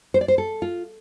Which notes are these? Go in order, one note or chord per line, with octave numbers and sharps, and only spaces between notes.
C5
D5
C5
A4
F4